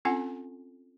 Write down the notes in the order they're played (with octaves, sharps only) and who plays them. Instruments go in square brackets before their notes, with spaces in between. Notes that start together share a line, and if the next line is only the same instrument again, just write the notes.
[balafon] C4 C#4 F4 A4 F#5 G#5